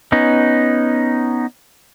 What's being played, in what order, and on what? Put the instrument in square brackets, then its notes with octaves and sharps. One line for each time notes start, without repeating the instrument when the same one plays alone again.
[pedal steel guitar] B3 C#4 D#4